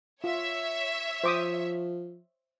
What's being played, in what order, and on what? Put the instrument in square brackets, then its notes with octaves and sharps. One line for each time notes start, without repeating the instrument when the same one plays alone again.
[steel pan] F4 [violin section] C#5 E5
[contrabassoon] F3 [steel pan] C5 D6 D#6